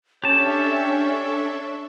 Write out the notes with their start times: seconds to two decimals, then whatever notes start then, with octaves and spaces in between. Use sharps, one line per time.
0.24 C#4 D4 G4 A4 C#5 E5 A5